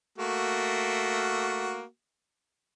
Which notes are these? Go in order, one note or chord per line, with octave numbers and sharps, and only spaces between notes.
A3 A#3 F#4